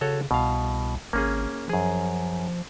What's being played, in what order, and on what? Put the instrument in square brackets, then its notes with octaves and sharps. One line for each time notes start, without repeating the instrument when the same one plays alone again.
[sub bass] C#3 [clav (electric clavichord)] F#4 A4 C#5
[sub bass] C2 [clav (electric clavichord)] B2 F5
[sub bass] G#1 [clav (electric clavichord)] A#3 C#4 G#4
[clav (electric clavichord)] F#2 G#4 [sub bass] F3